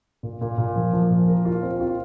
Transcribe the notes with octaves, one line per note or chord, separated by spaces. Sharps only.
A#2
A#2
A#2
F3
F3
A#2
A#4
F4
C4
F4